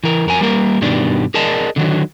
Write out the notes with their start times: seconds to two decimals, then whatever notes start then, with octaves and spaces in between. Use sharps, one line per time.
0.04 E3 A#4
0.26 F2 A#4 G#5
0.41 G3 A#3 A#4
0.81 G2 B2 D#3 G3 D4
1.34 G#4 A#4 D5 D#5 A5
1.76 D3 D#3 F#3